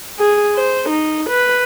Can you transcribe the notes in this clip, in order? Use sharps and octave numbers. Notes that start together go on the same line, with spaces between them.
G#4
C5
D#4
B4